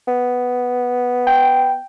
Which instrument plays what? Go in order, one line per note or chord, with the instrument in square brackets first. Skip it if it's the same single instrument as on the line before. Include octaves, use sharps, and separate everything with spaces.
[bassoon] B3
[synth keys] G5